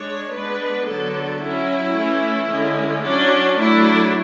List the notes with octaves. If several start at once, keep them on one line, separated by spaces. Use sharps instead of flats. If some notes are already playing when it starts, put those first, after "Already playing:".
Already playing: G#3 D4 C#5
G#3 B3 D4 B4
D3 F#3 B3 D4 A4
F#3 C#4 E4
E3 A3 C#4
D3 G#3 C#4
F#3 C#4 D4
F#3 A3 D4 E4